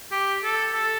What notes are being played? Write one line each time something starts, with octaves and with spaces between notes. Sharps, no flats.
G4
A4
A4